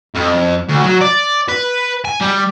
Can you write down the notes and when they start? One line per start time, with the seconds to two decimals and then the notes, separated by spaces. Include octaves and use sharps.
0.15 F2
0.68 D2
0.83 F#3
1.01 D5
1.49 B4
2.05 G#5
2.21 G3